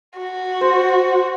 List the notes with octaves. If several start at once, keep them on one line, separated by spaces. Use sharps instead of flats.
F#4
C5